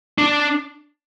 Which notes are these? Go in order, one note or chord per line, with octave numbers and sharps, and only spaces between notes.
D4